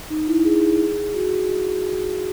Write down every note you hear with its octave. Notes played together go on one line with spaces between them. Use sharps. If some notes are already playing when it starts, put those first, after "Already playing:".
D#4
E4
G#4
F#4